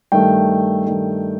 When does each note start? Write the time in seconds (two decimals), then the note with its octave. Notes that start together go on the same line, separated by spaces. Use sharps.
0.12 G2 D#3 A3 G5
0.86 G2 D#3 A3